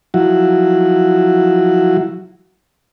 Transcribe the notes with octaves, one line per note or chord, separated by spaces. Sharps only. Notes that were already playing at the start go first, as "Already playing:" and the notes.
F3 F#3 E4 F#4